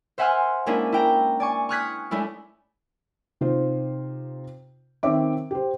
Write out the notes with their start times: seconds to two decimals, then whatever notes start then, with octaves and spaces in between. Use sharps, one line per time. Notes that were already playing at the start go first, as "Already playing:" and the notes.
0.18 C5 E5 F#5 G#5 C6 F6
0.66 G#3 A#3 C#4 D4 E4 G#4
0.92 E4 G5 A#5
1.40 D5 G#5 C#6
1.69 C#6 D#6 F6 F#6 G#6 B6
2.11 G#3 A3 C#4 D4 E4
3.41 C3 D#4 F4 C5
5.03 D#3 C4 C#5 E5 D6
5.51 G4 C5